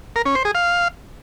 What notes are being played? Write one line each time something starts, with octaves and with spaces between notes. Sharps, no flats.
A#4
C#4
C5
G#4
F5